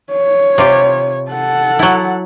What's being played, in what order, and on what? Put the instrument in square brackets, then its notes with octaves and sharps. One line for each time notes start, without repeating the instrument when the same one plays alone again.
[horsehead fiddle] C#5
[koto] C3 F4 G4
[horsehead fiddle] A4 F#5
[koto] F#3 E4